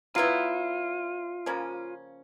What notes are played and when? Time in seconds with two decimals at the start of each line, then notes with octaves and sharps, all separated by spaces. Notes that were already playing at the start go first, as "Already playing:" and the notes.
0.15 F#3 B3 E4 F4
1.46 C#3 F3 A#3 C#4